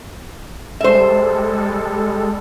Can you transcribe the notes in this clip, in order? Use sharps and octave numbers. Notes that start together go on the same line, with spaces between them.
G3 G#3 A4 C5 E5